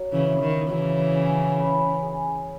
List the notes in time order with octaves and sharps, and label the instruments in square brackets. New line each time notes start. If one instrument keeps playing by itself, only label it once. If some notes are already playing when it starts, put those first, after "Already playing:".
Already playing: [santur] F#3
[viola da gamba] C#3 E3
[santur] E4
[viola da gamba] D#3
[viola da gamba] C#3 E3 [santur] F#3
[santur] C#4
B4
G#4